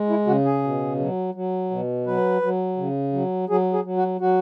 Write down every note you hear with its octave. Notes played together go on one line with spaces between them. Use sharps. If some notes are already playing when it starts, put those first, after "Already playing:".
Already playing: G#3
E4
C#3 F#4
G#4
B2
F#3
F#3
B2
F#3 B4
F#3
C#3
F#3
F#3 G#4
G#4
F#3
F#4
F#3 F#4